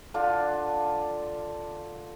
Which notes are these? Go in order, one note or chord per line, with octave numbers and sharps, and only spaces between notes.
D3 D4 F4